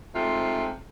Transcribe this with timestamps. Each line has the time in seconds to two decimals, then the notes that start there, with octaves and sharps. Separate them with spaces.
0.15 G#2 C3 A3 F4